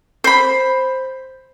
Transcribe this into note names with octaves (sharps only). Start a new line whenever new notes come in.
C5 B5